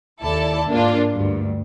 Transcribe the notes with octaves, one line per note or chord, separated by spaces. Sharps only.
D#2 E4 A4 D5 A5
G#2 A#3 D4 F4
D2 G2